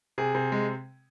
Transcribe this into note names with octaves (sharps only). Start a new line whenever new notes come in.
C3 G#4
C3
G#3